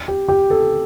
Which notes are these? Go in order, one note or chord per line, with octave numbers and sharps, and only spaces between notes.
G4
G4
A4